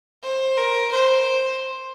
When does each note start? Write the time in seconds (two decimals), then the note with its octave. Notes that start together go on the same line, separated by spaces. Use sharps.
0.23 C5
0.57 A#4
0.92 C5